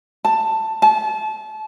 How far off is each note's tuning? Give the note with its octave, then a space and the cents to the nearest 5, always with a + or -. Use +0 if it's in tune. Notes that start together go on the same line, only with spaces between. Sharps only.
A5 +10
A5 -30